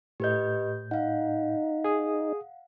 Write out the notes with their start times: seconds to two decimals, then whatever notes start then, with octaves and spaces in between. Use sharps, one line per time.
0.20 A2 G4 B4 D#5 G6
0.91 D#4 F5 F#5
1.84 G#4 D#6